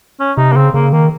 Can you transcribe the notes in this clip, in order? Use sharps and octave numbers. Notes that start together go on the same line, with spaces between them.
C#4
C3 D#4
A#3
C#3 C4
C#3 A#3
D#3 A#3